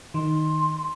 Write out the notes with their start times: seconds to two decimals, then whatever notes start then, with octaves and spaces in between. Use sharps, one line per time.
0.14 D#3 C6